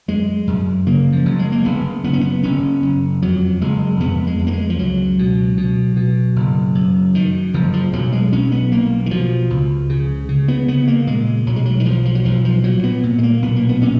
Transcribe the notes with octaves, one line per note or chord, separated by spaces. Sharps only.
F#2 G#3
F#2
C#3 A#3
F3
F#1 F#3
G#3
A#3
F#1 B3
F#1 B3
C#4
B3
F#1 C#4
F#1
F2 F#3
F#1 G#3
F2 B3
G#3
F2
A#3
G#3
F3
C#2 F#3
B2
B2
B2
F#1
F#2
F#2 D#3
F#1 F3
F3
B1 F#3
G#3
B1 C#4
B3
B1 A#3
D#3
B2 F3
C#2
C#3
C#3
B3
C#3 B3
A#3
A#2 G#3
B1 F#3
G#3
F#3
D#3
B1 F3
F3
F#3
B1 F3
F3
A#2 F#3
B3
A#2
G#3
A#3
B1 B3
A#3
B3
A#2 C#4